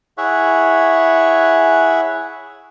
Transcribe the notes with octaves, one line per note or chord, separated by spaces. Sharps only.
E4 G#4 C#5 E5 F#5 C#6